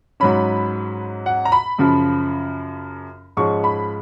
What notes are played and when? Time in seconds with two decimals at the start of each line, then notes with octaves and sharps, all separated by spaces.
0.20 G#2 F#3 C#4 B5
1.26 F#5
1.45 A#5
1.52 B5
1.78 F#2 C#3 F3
3.37 G#2 F3 G#3 C#4 C#6
3.64 B5